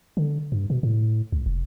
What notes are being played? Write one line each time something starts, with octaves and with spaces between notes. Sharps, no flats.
D3
G2
B2
A2
C#2
F1